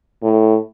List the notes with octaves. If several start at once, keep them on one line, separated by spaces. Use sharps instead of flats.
A2